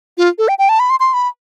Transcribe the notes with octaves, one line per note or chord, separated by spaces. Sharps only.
F4
A4
G5
G5
A5
B5
C6
C6
B5